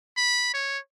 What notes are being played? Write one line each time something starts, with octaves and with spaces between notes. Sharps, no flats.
B5
C#5